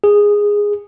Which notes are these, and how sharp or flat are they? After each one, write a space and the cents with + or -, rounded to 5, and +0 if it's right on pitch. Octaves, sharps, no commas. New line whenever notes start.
G#4 -10